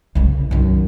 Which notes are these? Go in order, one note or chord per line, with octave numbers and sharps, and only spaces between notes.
C2 C#3
F#2 D#3